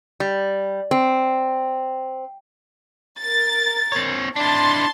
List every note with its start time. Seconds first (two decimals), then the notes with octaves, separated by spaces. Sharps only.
0.20 G3
0.91 C4
3.19 A#4 A6
3.92 C4 C#5
4.36 D4 E4 A5 C6 A6